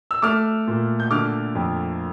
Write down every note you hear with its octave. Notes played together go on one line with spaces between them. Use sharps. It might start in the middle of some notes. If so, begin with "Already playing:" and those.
E6
A3 D6 F6
A#2
G6
D3 D6 F6
F2